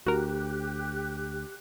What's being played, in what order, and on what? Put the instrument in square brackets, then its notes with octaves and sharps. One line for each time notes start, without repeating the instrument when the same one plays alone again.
[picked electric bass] D2 [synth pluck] F#4 A#4 [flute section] G4 F#6